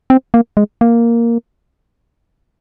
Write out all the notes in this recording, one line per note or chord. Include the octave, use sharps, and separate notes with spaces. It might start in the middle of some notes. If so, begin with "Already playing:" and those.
C4
A#3
G#3
A#3